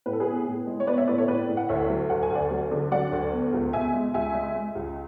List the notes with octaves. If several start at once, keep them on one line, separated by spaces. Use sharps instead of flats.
A2 B4
A4
G#4 B4
B3
A2
G#3
C#5
B3 B4 D5
C#5 E5
A2 B4 D5
A4 C#5
A2 B4 D5
A2
F#5
D2 C#5 E5
F#3
D2 F#5
G#5
D2 D5 F#5
F#3
D3
F#3 D5 F#5
D2
B3
C#2
B2 E5 G#5
G#3
C#2 E5 G#5
G#3
G#3
C#2